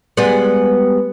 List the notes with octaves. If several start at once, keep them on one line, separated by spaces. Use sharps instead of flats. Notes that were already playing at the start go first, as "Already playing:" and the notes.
G3 G#3 B3